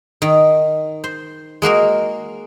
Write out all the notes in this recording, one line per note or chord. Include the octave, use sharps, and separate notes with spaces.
D#3
C5
G#3 A#3 F#4 A#4